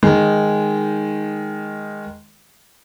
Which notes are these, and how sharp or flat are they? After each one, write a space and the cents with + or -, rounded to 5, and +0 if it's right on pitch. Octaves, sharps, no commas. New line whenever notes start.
D#3 +0 G#3 +0 D#4 +0